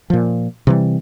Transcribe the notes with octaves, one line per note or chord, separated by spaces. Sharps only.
A#2 F3
C3 E3 G3